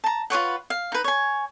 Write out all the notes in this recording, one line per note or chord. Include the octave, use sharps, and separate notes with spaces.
A5 A#5
F4 B4 C#5 F#5
F5
D#4 B4
C#5 G#5